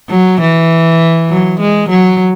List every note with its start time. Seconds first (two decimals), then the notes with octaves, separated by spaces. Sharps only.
0.10 F#3
0.41 E3
1.30 F#3
1.60 G#3
1.89 F#3